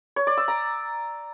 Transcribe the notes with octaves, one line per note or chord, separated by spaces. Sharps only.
C#5
D5
E6
A#5